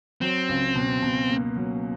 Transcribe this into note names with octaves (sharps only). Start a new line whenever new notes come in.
F#3 C4
C#2
B2
B2
A#3
F#3